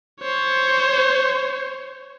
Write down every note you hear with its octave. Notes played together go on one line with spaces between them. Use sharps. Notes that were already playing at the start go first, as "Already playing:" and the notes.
C5 C#5